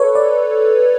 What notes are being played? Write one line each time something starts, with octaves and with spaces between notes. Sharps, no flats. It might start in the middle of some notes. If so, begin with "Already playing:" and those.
Already playing: A4 B4 C#5
D5